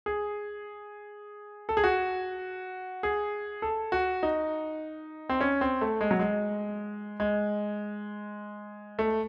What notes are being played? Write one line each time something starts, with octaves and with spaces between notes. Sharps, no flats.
G#4
A4
G#4
F#4
G#4
A4
F#4
D#4
C4
C#4
C4
A3
G#3
F#3
G#3
G#3
A3